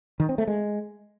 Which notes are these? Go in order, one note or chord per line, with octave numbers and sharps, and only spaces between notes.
D#3
C4
A3
G#3